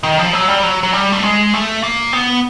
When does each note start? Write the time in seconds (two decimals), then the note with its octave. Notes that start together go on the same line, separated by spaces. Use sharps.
0.03 D#3
0.18 F3
0.33 F#3
0.48 G3
0.63 F#3
0.83 F#3
0.93 G3
1.12 A3
1.23 G#3
1.54 A3
1.83 A#3
2.13 B3